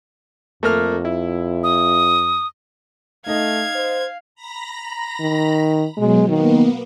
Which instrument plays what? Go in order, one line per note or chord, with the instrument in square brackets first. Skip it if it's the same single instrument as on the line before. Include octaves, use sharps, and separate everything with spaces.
[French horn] F2 [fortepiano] A3 A#3 F6
[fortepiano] E4
[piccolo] D#6
[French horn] A3 [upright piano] D#4 D#5 [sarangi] F5 [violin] G#6
[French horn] C5
[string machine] A#5 B5 A#6
[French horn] D#3
[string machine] B2 F#3 [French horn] G#3
[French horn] D#3 [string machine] A#3 B3